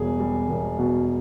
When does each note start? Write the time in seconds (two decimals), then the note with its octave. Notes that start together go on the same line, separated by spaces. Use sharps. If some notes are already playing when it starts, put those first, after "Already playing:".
Already playing: E1 B2 G3 G#4
0.19 G3
0.49 E1
0.79 B2